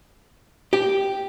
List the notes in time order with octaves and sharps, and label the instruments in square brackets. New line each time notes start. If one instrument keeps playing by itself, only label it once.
[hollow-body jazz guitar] G4